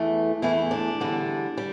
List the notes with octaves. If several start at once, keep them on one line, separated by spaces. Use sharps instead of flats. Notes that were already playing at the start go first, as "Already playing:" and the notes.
Already playing: E2 E3 A3
E2 E3 A3 E4
D4
E2 D3 G3
G3